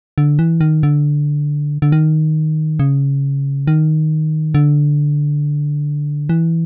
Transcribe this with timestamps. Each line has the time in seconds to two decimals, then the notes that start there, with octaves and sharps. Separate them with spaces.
0.18 D3
0.39 E3
0.61 D#3
0.83 D3
1.82 D3
1.92 D#3
2.79 C#3
3.67 D#3
4.55 D3
6.29 E3